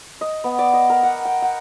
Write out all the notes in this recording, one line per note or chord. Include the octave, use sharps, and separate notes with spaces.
D#5
B3
D5
D#5
A#4
F#5
G5
F#5